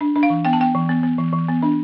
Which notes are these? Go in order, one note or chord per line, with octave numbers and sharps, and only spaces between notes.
D4
D4
F5
E3
B3 G5
A5
B3 G5
E3
B3
B3
E3
E3
B3
D4